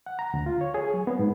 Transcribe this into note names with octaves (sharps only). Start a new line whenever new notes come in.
F#5
A#5
D2
F4
C#5
G#4
F#3
B3
G#2